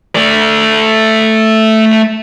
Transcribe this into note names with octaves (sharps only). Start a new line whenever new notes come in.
A3 D5